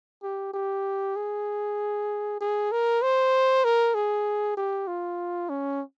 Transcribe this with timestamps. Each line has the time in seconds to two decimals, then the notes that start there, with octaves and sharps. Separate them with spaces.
0.23 G4
0.54 G4
1.16 G#4
2.41 G#4
2.72 A#4
3.03 C5
3.65 A#4
3.95 G#4
4.57 G4
4.87 F4
5.49 C#4